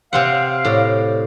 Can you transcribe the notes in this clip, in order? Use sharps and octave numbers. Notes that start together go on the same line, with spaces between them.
C3 C4 F5 F#5
A2 D5